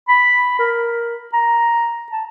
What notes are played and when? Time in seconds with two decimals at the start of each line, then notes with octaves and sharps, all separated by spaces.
0.09 B5
0.59 A#4
1.33 A#5
2.12 A5